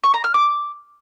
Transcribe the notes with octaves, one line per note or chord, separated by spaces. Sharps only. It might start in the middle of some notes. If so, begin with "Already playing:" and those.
C#6
A#5
F6
D6